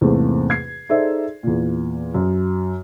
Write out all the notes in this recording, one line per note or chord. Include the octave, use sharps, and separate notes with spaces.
E2 G#2 C3 A3 A#3 C4
G#6 C7
D#4 G#4 A4 C5 D5 E5
E2 A#2
F#2